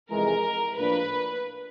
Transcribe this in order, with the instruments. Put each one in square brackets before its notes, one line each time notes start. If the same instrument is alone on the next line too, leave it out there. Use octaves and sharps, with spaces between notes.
[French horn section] F2 C3 E3 G#3 [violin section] A#4
[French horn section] A2 F3 A#3 D4 [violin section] B4